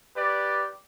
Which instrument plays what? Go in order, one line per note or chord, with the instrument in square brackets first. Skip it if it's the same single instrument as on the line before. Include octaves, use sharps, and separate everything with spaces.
[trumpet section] G4 B4 D5